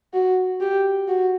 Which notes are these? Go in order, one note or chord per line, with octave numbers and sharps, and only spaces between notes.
F#4
G4
F#4